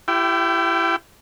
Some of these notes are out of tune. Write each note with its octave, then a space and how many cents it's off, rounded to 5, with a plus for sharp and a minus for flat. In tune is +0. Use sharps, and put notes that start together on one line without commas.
E4 +30 G4 +0 G5 -25